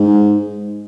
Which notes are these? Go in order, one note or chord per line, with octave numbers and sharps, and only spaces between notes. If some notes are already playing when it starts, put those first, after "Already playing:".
Already playing: G#2